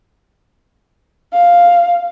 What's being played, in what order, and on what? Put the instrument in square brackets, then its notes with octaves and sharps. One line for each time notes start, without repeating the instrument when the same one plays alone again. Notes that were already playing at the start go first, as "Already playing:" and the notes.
[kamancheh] F5